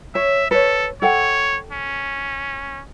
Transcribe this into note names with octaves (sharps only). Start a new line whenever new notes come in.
C#5 E5
A4 B4 C#5
A4 C#5 F#5 G5
C#4